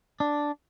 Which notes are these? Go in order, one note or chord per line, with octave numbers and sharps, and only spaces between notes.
D4